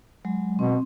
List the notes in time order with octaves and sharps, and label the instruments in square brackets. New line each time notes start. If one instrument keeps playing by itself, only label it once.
[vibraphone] F#3 G#3
[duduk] B2 [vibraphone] C4